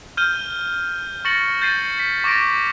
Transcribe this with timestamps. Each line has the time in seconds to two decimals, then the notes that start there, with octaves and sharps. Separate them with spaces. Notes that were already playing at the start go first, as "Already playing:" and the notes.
0.17 F6 G6 D#7 G7
1.25 C#6 A6 A#6 C#7 F#7
1.62 G6 A6 C7 D#7
1.99 B6
2.24 C#6 D6 A6 A#6 D7